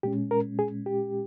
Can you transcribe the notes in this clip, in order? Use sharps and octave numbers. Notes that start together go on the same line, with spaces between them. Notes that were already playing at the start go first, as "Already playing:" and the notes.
A#2 G#3 C#4 G4
A#4
G#4
G4